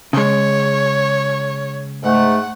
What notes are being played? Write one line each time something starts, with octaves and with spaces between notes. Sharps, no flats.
C#3 G#3 C#5
G#2 A3 F#5